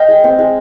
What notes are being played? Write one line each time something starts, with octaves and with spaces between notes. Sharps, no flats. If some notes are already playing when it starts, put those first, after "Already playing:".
Already playing: D#5 F5 G5
G#3
C4
G#3